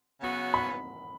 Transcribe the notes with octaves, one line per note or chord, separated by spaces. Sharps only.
C#3 F#3 B3 F#4
B5